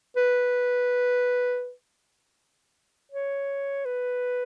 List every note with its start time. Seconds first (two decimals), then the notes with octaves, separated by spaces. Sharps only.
0.16 B4
3.12 C#5
3.85 B4